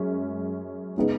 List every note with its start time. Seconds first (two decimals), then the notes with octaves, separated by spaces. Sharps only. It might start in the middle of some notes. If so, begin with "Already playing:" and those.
Already playing: F#2 G#3 C#4
0.97 C#3 G#3 B3 D#4